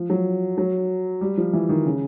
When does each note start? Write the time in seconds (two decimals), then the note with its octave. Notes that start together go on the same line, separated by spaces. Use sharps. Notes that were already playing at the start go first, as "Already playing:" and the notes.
Already playing: F3
0.10 F#3
0.58 F#3
1.21 G3
1.37 F3
1.53 E3
1.69 D#3
1.86 C#3